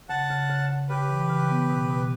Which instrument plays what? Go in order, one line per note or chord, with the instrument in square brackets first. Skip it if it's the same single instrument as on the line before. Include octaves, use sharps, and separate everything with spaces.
[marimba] C#3 [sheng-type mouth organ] F#5 A5
[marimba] C#3
C#3
C#3
[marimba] C#3 [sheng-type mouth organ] G4 B4
[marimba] E3
C#3
B3
B2
B2